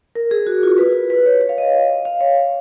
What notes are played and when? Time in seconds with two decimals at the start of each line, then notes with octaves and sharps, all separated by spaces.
0.15 A#4
0.31 G#4
0.47 F#4
0.63 F4
0.78 B4
1.10 B4
1.26 C#5
1.41 C#5
1.49 F5
1.58 D#5
2.05 F5
2.21 C#5